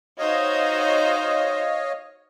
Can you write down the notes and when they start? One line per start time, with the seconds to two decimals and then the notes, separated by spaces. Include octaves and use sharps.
0.19 D#4 F#4 C5 C#5 D#5 F5